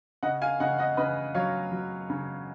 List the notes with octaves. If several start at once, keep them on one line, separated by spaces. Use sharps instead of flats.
C#3 D#5 F#5
F5 G#5
C#3 D#5 F#5
D#5 F#5
C#3 B4 D#5
F#3 C#5 F5
F#3
C#3